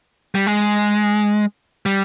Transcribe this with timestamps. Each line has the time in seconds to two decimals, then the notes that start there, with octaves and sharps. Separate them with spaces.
0.35 G3
0.47 G#3
1.86 G3